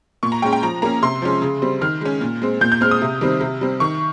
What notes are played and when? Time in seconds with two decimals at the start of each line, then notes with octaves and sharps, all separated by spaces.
0.23 A#2 C#6
0.32 A#5
0.42 G#3 C#4 G5
0.53 G5
0.63 F3 A#5
0.82 A#3 C#4 A#5
1.02 C3 C6
1.22 F3 G#3 C#4
1.42 C#3
1.62 G3 C4
1.82 D#3 F6
2.01 G#3 C#4
2.21 A#2
2.42 G#3 C4
2.61 A#2 G6
2.72 G6
2.81 G#3 C4 F6
2.91 D#6
3.02 C3
3.21 D#3 G3 C4
3.41 C3
3.61 G3 C4
3.80 D#3 C#6